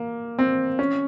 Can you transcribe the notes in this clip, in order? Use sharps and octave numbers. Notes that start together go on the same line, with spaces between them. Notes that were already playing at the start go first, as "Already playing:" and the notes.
Already playing: A#3
C4
C#4